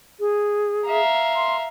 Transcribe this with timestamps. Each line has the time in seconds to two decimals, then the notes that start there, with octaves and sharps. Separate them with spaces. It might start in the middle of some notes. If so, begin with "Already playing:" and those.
0.20 G#4
0.87 E5 F5 A#5
1.36 C6